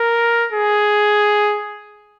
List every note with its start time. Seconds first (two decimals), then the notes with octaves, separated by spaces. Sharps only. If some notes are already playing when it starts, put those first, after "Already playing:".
Already playing: A#4
0.52 G#4